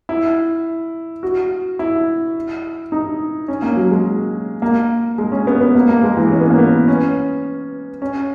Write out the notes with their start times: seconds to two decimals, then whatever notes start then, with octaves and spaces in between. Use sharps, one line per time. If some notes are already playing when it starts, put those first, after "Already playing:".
0.09 E4
1.23 F#4
1.79 E4
2.92 D#4
3.48 C#4
3.62 A#3
3.77 F#3
3.91 G#3
4.62 A#3
5.18 G#3
5.32 C#4
5.47 B3
5.61 B3
5.75 A#3
5.89 A#3
6.03 G#3
6.17 E3
6.32 C#4
6.41 B3
6.50 A#3
6.58 B3
6.88 C#4
8.02 C#4